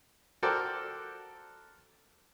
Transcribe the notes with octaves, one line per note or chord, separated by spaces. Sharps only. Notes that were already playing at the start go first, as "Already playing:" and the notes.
F#4 A4 A#4 C5 D5 G5